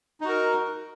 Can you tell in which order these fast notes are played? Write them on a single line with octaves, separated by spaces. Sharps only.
D#4 F#4 A#4